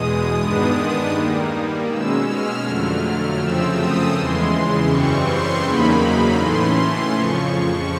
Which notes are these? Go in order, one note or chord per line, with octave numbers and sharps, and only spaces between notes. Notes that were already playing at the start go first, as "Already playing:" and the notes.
Already playing: E2 B2 G#3 D#6
G2 D#3 G#3 B3 D4
D#3 G3 A#3
B2 G#3 C#4 E6
F6
F2 D3 F#3 A3
F#2 C#3 F3 A3 C4 E6
D#6
E2 C#3 E3 G#3 C6
F#2 C#3 E3 G3 C4 C#6
C6
E2 C#3 F#3 A#3 D#4 B5
A2 E3 A3 C#4 C6
F2 C#3 F3 C#6